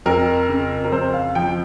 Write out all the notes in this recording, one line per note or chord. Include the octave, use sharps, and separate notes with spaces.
F2 A#4
C#3
A#4
F2 C5
F5
F3 G5